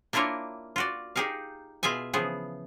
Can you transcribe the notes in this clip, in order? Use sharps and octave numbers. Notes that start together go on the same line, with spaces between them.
A#3 D4 E4 F4 A#4 C#5
F4 F#4 D5
D#4 G4 G#4 A#4 F5
B2 F4 G#4 E5 G#5
C#3 E3 F3 B3 G#4